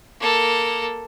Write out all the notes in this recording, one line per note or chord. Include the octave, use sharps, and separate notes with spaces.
A#3 A4